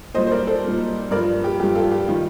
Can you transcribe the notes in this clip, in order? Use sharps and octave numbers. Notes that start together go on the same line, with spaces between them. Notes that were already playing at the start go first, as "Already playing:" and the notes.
A#2 G3 C5 D#5
C5
A#4 D5
A4 C5
A#2 G3
G2 F3 A#4 D5
G4
G2 F3 G4
F4 A4
G4
D#3 G3 F4